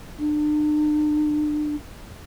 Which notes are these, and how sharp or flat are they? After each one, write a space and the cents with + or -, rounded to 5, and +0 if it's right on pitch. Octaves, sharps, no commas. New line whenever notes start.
D4 +40